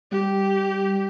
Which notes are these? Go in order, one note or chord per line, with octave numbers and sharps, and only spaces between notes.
G3 G4